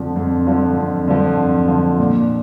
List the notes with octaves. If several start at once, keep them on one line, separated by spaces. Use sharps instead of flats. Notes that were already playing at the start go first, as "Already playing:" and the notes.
Already playing: F2 D3 F3
F2
D3 F3
F2
D3 F3
F2
D3 F3
A#2